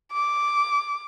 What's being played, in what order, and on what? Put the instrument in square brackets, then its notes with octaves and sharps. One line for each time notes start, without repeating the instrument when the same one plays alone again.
[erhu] D6